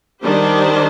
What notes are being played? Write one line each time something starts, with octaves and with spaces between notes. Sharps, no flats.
D#3 G3 D4 G4 C5